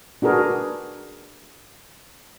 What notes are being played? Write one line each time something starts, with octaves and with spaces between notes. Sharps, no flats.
D4 F#4 G#4 A#4 B4